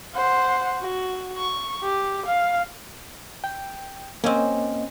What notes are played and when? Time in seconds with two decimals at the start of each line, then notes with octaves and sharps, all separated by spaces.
0.15 C5 F#5
0.82 F#4
1.38 C#6
1.83 G4
2.27 F5
3.44 G5
4.24 A#3 C4 C#4 D#5